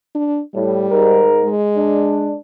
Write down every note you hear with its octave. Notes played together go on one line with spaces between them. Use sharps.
D4
A2 G3
G#2 A#4
G#3
D4